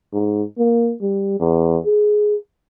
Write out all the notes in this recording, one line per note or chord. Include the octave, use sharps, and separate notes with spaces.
G#2
A#3
G3
E2
G#4